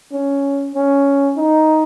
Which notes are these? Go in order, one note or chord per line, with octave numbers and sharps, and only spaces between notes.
C#4
C#4
D#4